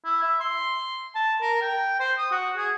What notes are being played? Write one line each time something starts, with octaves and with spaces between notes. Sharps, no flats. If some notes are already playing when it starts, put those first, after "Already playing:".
E4
E5
C6
A5
A#4
G5
C5
D#6
F#4
G#4